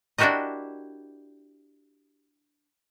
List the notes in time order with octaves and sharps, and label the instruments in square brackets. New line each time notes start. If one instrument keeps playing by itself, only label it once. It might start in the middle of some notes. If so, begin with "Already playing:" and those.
[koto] D4 E4 F#4 G4 A#4 D#5